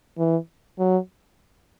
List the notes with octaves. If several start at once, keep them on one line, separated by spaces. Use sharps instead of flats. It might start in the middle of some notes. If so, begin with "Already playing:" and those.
E3
F#3